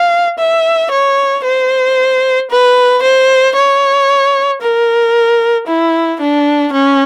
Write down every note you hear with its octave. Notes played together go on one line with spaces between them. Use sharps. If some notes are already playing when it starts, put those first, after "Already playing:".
Already playing: F5
E5
C#5
C5
B4
C5
C#5
A#4
E4
D4
C#4